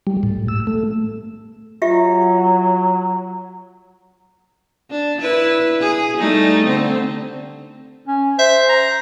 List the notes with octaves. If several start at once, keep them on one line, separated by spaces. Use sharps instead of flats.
G3
A2
E6
A3
F#3 F4 G4 E5
D4
E4 B4
G#4
G3 A3 D#4
D3 C4
C#4
C5 E5
A#5